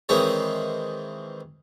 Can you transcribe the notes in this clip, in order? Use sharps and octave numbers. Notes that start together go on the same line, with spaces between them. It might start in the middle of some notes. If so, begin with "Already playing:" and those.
D#3 E3 G#3 C4 G#4 C#5